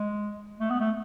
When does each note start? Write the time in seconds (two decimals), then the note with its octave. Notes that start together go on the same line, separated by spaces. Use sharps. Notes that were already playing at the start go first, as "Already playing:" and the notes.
Already playing: G#3
0.60 A3
0.70 B3
0.80 A3